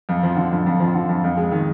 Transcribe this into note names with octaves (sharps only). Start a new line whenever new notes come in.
F2
F3
D3
F2
F2
F3
D3
F2
F2
G#3
D#3